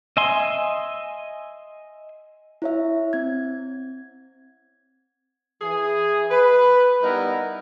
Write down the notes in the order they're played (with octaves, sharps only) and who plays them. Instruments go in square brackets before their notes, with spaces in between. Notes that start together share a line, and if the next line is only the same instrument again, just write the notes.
[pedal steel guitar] D#5 E5 G#5 C6
[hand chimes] E4 C#5 E5
C4 G#6
[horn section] E3 G#4
B4
G3 B3 D#4 E4 A#4